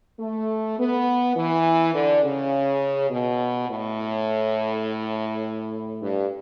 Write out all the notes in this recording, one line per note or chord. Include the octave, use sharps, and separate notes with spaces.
A3
B3
E3
D3
C#3
B2
A2
G2